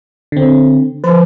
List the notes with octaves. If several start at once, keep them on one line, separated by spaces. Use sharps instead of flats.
D3 C4
F3 B4